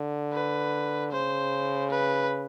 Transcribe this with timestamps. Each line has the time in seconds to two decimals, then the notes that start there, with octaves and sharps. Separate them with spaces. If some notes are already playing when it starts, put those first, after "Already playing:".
Already playing: D3
0.33 B4
1.12 C#3 C5
1.91 B4